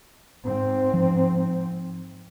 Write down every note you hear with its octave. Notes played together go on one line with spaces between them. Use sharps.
G#2 C4
F3